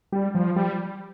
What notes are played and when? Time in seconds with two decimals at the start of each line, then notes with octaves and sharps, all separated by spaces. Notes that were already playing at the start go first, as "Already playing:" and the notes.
0.12 G3
0.35 F3
0.56 G3